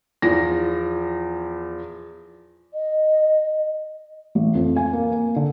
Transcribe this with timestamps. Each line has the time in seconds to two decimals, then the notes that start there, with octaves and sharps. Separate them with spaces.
0.22 E2 F3 A#6
2.74 D#5
4.35 A1
4.55 F2
4.76 G#5
4.93 A#3
5.12 A#3
5.36 D3